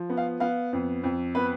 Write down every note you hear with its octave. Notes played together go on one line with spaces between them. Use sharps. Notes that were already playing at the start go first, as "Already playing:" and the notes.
Already playing: F3
B3
F5
B3 F5
F2
F2
B3 B4